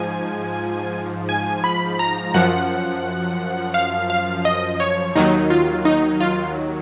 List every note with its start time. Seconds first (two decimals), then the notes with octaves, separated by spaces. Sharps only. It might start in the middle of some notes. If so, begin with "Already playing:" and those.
Already playing: G#2 F3 G#5
1.29 G#5
1.64 B5
1.99 A#5
2.34 F#2 F3 F#5
3.74 F5
4.10 F5
4.45 D#5
4.80 C#5
5.16 D#2 D#3 F#3 D#4
5.50 F4
5.85 D#4
6.20 F4